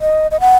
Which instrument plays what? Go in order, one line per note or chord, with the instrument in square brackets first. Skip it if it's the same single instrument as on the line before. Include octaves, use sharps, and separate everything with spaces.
[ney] D#5
D#5
F#5